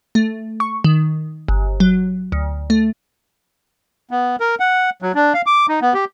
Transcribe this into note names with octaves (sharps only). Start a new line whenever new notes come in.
A3
C#6
D#3
G1
F#3
D2
A3
B3
A#4
F#5
F#3
D4
F5
D6
D#4
B3
G4